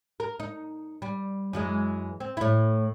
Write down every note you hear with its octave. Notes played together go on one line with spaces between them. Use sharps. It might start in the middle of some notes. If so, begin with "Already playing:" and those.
A#4
D#4
G3
F#2 E3 G#3
C4
A2 E4